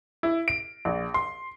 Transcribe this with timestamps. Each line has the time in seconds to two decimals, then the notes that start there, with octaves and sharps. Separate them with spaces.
0.23 E4
0.48 D7
0.85 A#1
1.14 C6